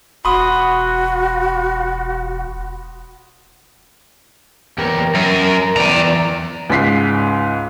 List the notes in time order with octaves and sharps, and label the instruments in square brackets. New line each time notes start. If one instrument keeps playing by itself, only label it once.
[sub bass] E1 [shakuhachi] F#4 [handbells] B5 C6 D#6
[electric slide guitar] E2 G4 A#4
[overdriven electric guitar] F#2 [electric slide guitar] A#4
[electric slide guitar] E2 D5 [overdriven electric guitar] G5 A#5
[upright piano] C#2 G#2 B6 C7